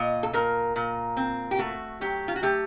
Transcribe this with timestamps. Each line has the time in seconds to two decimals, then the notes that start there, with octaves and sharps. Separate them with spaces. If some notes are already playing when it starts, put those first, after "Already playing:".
Already playing: A#2 D#5
0.23 A4
0.33 A#2 A#4
0.76 A#2
1.17 C4
1.51 G4
1.58 A3 F#4
2.01 F#3 G4
2.28 F4
2.36 F#4
2.42 A3 G4